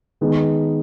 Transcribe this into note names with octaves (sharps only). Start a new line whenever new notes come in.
D#3 G#3 B3 D#4 G#4